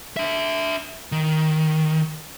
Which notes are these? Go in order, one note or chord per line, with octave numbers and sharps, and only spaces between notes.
D4 E5
D#3